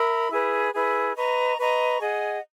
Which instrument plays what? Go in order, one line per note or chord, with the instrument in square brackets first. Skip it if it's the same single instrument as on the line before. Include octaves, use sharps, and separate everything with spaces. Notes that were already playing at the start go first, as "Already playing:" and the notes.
Already playing: [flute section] A#4 E5 B5
E4 G#4 B4
E4 G#4 B4
B4 D#5 A#5 C#6
B4 D#5 A#5 C#6
G#4 D#5 F#5